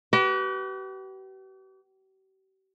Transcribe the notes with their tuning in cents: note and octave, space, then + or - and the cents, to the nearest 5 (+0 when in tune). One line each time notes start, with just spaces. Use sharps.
G4 -45 B4 +0